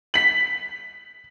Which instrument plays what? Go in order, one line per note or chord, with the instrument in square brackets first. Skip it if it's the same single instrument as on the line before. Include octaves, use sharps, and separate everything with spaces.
[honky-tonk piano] B6 F#7